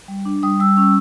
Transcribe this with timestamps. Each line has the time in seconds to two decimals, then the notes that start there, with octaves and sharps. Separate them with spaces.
0.08 G3
0.25 D4
0.43 G3 D#6
0.60 G3 E6
0.77 C#4 E6